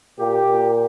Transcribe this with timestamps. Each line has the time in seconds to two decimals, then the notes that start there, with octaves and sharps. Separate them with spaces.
0.18 A#2 G4
0.47 A#2